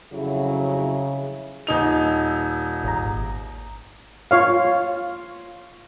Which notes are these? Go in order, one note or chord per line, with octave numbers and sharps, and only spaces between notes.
F2 C#3 F#3 E4
D#1 D#4 F7
E6
G#1 A#5
F4 C#5 F5